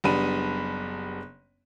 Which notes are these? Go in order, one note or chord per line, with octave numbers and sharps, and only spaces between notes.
F#1 G3 B3 D4 B5 D#7